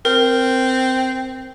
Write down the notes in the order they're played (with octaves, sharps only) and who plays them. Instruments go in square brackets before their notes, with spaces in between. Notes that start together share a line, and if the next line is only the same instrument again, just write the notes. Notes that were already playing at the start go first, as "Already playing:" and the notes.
[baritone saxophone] C4 [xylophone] A#4